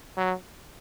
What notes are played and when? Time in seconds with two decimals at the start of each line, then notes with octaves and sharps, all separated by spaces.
0.18 F#3